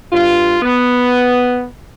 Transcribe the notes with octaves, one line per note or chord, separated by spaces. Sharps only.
G2 F4
B3